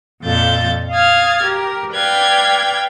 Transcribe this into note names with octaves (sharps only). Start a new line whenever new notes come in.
F2 A#2 F4 A4 G6 A6
F5 D#6 F6 G#6 A6
G4 A#4
B4 D5 F5 G5 G#6